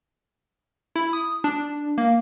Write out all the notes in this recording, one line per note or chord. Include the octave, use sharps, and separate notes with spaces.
E4
D#6
D4
A#3